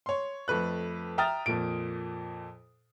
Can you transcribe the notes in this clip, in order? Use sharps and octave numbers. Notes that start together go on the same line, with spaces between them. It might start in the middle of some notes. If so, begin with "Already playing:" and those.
C#5 C6
F2 A3 B4 F#6
E5 G5 A#5 D#6 F6 A6
F2 A#2 D7